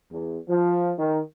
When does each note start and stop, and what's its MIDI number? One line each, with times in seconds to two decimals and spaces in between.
0.11 0.38 40
0.48 0.92 53
0.98 1.20 51